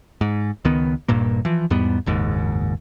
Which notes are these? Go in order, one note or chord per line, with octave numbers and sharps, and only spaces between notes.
G#2
C#2 D#3 B3
D#1 G2 A#2 A#3
E3 F3
E2 G#2 G3 B3
F#1 D#2 G#2